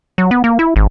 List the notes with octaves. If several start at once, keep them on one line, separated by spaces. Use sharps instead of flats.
F#3
B3
A#3
E4
G#1